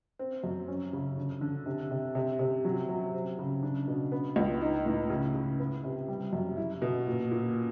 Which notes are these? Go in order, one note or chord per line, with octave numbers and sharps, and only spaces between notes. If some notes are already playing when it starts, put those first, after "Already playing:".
C4
F#2
C#4
C#3
D3
D3
C3
C3
C3
C3
F#3
F#3
C4
C#3
D4
B2
B3
C#2
D#4
A2
C#3
C#3
B3
C3
G3
F#2
E4
B2
A#2
A#2